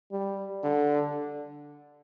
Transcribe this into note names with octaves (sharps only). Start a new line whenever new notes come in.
G3
D3